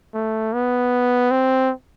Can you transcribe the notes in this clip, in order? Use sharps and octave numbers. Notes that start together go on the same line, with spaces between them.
A3
B3
C4